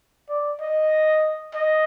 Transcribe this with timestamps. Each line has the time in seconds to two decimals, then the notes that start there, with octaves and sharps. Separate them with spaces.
0.29 D5
0.60 D#5
1.54 D#5